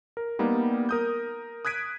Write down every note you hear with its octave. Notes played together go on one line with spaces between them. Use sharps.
A#4
G3 A#3 B3 D#4
A#4 D#6 G6
D#6 F#6 G#6 B6 D7 D#7